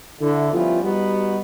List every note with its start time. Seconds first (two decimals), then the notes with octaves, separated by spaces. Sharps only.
0.21 D3 E4
0.53 F3 G3 B3 C#4 E4 F4
0.84 G3 B3 D#4 F#4